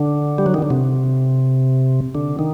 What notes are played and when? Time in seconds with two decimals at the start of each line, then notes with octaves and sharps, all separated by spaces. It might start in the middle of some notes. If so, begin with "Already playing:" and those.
Already playing: D3
0.38 G3
0.46 F#3
0.54 D#3
0.62 D3
0.70 C3
2.15 D3
2.39 D#3